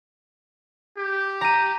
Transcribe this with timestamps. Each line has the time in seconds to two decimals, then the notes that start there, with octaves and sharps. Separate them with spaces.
0.97 G4
1.41 A#5 D#7